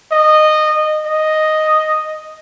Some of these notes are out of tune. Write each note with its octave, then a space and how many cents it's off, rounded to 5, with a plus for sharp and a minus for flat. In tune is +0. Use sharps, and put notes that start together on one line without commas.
D#5 -15
D#5 +0